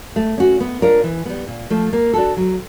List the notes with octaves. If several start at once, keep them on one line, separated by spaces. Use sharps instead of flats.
A3
C#4 F#4
B3
D4 F4 A#4 C#5
E3
G3 B3
A#2
F3 A3
A#3
D4 F#4 A4
F#3